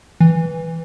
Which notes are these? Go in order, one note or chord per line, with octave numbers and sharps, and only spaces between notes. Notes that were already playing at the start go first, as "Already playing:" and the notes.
E3